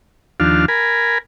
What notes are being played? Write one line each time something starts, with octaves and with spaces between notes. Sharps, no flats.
D#2 F3 D4 F5
A#4 G#5 B5